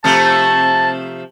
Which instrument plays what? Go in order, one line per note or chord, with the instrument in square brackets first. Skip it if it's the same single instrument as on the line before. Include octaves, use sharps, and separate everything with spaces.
[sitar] C3 F3 A3 [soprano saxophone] A5